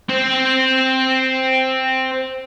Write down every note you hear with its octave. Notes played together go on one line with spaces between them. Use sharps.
C4 C5